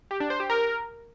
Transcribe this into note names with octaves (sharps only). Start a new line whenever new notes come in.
G4
D4
C5
G4
A#4